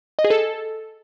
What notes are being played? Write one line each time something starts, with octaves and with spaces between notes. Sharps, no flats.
D#5
G#4
A4